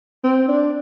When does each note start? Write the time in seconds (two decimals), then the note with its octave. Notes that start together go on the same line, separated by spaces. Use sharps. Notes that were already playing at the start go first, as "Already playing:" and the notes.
0.24 C4
0.48 D4